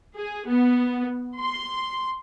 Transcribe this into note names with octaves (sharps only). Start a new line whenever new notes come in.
G#4
B3
C6